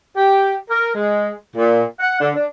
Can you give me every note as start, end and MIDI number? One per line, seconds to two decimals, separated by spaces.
0.16 0.56 67
0.70 0.91 70
0.95 1.34 56
1.56 1.83 46
2.00 2.19 78
2.21 2.33 50
2.35 2.45 62